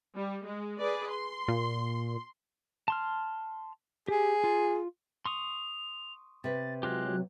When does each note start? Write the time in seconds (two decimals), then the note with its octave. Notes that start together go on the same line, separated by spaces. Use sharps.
0.15 G3
0.45 G#3
0.80 G#4 B4 D5
1.10 C6
1.48 A#2
2.88 A5 C6 F6
4.08 G4 G#4
4.44 F4
5.25 C6 C#6 D#6 F7
6.44 C3 B4 A6
6.83 F#3 G#3 F4 G4 F#6